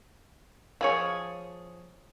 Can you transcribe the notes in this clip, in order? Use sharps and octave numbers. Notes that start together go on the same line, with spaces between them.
F3 G#4 C#5